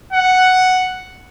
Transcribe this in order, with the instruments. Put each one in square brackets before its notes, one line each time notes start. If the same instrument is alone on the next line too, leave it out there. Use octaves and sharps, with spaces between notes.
[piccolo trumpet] F#5